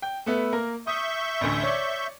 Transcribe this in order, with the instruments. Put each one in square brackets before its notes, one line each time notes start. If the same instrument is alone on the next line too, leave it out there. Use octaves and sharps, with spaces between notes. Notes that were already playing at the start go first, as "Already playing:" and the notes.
[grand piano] G5
A3 B3 E5
A#3 A#4
[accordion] E5 C#6 G6 [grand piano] D#6
[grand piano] A1 D2
C#5 D5